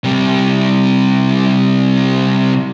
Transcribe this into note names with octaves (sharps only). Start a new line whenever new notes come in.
C3 G3